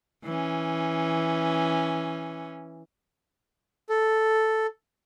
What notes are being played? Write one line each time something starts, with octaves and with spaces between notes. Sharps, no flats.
E3 C#4
A4